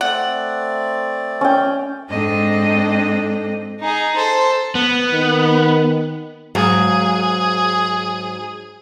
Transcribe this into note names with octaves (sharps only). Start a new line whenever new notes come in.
A3 C4 D5 F#5
C#4 G5
G#2 C4 D4 A4 D#5
D#4 G#4
A4 C5
B3
D#3
G#2 F#3 G#4 F5